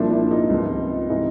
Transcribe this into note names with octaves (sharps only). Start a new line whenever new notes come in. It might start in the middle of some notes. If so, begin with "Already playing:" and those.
Already playing: C2 A#2 F3 D4 E4
D4 E4
D#4 F4
C#2 C3 F3
C3 E3 D#4 F4